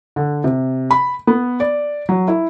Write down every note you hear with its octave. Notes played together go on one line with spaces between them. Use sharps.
D3
C3
B5
B3
D5
F#3
E4